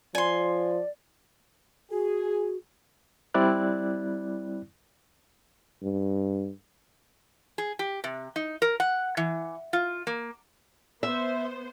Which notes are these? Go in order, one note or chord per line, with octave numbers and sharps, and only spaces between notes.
F3 D5 G#5 C6
F#4 G#4
G3 C4 E4 D5 F#6
G2
G#4
G4
C3
D#4
A#4
F#5
E3
F4
A#3
B3 C5 E5